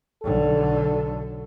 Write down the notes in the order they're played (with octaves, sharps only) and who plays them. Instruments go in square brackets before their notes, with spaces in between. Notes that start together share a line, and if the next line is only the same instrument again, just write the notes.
[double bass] B1 D3 [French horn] A4